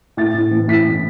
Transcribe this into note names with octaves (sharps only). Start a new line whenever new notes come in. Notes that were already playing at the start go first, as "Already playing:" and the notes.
A2 A6
A2
E3
A2 B6
A2